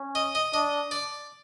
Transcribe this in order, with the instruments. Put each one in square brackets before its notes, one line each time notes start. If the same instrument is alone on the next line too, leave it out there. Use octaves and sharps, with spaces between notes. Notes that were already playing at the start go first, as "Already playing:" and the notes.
Already playing: [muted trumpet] C#4
[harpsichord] D#5
D#5
[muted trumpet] D4 [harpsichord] D#5
[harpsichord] D5